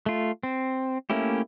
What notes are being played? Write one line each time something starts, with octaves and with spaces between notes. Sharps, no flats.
A3 F4
C4
A3 A#3 C#4 E4 G4